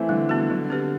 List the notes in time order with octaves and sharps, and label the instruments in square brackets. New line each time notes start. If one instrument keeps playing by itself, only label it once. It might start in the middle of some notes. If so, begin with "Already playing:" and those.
Already playing: [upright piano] E3 A3 C4
[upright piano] D3 [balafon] G3
[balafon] B3 F#4
[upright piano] D3 [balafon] F#3
[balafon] C4 G4 B4